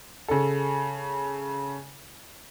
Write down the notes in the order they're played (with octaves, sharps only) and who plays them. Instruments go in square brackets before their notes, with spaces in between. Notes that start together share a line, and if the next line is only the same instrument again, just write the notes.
[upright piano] C#3 A4